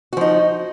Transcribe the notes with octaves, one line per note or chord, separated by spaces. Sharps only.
F3 D#4 F#4